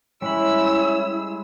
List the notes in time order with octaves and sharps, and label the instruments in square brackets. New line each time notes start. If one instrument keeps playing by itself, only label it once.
[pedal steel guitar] G3 G#3 B5 [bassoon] C#4 [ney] E4 [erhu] E6